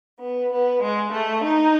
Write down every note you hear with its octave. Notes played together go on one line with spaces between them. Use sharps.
B3
B3
G#3
A3
D#4